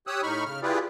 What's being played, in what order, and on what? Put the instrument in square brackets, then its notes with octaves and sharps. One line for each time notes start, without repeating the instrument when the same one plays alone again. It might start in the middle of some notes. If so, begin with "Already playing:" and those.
[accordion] G4 C#5 D#6 E6 F#6
A2 D#4 B5 C#6 F6
C#3 F6
E4 F4 G4 G#4 B4 D5